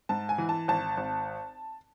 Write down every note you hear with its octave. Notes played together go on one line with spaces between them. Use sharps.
G#2 A5
G#5
E3
A5
G#1 A5
G#1